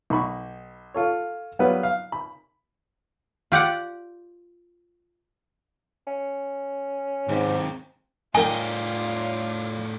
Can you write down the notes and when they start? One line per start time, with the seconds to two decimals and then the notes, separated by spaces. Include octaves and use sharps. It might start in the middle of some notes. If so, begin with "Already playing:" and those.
0.10 B1 D#4 B5 C#6
0.94 F4 A4 C#5
1.59 F#3 G3 B3 F4 B4
1.83 F5
2.12 B5
3.52 F4 G4 D5 F#5
6.07 C#4
7.29 D#2 G#2 C3
8.35 A2 D#4 F4 G#4 A#4 D5 G5 G#5